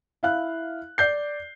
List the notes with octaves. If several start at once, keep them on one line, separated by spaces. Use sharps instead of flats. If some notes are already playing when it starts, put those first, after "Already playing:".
E4 F5 F#6
D5 G6 C7